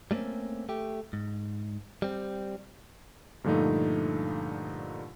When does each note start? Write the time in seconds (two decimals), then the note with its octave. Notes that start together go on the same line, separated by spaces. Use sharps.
0.11 G3 A3 A#3 C4 C#4
0.69 A3 G4
1.13 G#2
2.02 G3 C4
3.44 G2 A#2 D3 F3 A3 D#4